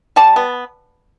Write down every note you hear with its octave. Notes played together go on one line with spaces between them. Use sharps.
G3 A5
B3